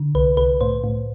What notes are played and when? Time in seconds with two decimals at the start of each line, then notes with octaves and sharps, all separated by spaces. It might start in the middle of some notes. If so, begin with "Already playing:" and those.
Already playing: D3
0.15 C2 B4
0.37 C2 B4
0.61 A2 C5
0.84 A2